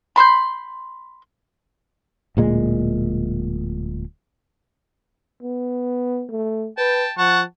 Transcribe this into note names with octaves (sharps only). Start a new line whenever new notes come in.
B5 C6 E6 G6
D1 A#2 G#3
B3
A3
B4 G5 A5
F3 F#5 A5 C#6